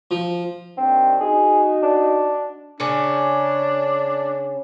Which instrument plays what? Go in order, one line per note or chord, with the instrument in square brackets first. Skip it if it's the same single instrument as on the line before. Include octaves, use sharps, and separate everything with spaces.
[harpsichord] F3
[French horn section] D#2 D4 [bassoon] C4
[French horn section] D#4 F#4 [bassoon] G#4
[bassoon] D4
[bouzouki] C#3 C#4 [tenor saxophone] D4